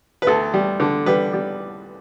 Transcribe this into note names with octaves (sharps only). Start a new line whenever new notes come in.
B4
D2 A4
G3
D3
G3 B4
G3